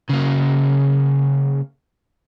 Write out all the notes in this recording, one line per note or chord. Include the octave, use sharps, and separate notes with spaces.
C#3 A#3